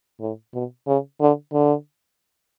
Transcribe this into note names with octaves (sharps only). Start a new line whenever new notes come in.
A2
B2
C#3
D3
D3